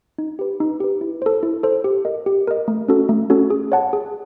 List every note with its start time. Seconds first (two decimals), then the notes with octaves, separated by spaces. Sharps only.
0.18 D#4
0.39 G4 B4
0.60 D#4
0.80 G4 B4
1.01 E4
1.22 A4 C5
1.43 E4
1.63 A4 C5
1.84 G4
2.05 A#4 D#5
2.26 G4
2.47 A#4 D#5
2.68 A3
2.88 C#4 F#4 A4
3.09 A3
3.30 C#4 F#4 A4
3.50 G#4
3.72 C#5 F#5 A5
3.93 G#4